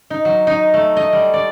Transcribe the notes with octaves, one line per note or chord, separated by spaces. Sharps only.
D#4
F#3
D#4
A3
D#5
G3
D5